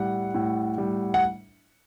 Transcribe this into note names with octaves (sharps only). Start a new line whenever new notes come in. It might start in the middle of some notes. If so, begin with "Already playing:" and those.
Already playing: A2 G3 F#5
A2
G3
F#5